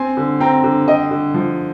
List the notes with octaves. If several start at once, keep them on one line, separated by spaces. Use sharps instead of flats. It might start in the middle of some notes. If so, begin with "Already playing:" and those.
Already playing: C4 G#5 C6
D3
C4 G5 A#5
D3
D3 D#5 G5
D3
F3